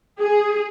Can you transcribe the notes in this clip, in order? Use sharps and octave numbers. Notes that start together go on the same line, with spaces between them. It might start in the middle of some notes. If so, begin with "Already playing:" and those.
G#4